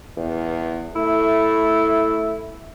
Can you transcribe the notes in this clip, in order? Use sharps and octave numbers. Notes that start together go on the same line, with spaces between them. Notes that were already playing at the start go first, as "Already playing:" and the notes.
E2
A3 E4